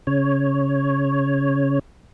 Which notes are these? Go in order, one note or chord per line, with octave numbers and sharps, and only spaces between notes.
C#3 C#5